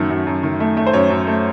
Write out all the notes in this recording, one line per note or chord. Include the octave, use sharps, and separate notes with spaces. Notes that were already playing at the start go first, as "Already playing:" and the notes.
Already playing: F#2 D#3 A3
F#2
F#2
D#3
A3
A3
C5
F#2 C#5
F#2
A3